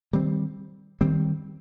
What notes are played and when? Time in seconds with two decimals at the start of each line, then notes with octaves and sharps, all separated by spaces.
0.13 D#3 G3 C4
1.01 D#3 G3 C4